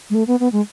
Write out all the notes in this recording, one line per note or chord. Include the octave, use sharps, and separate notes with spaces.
G#3
A3
B3
B3
G#3